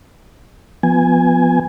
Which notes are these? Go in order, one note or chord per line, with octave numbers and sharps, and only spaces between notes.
F3 B3 G#5